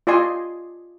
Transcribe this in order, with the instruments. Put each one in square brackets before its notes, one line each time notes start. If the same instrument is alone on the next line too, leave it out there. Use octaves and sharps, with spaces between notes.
[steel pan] F4 D5 D#5 G#5 C6